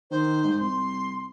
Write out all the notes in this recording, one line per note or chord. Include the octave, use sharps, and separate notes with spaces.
D#3 C5
G#2
C2 C6